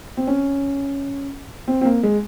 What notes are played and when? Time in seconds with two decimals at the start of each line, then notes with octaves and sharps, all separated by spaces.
0.17 C4
0.27 C#4
1.68 C4
1.81 C4
1.85 A#3
2.03 G#3